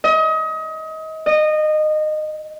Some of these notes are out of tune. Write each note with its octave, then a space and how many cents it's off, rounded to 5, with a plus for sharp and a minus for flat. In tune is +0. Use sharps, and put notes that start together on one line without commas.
D#5 +30
D#5 -20